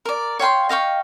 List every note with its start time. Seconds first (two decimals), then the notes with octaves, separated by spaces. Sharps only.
0.05 A#4 D5
0.39 C#5 F5 G5 C6
0.69 D#5 F5 G5 C#6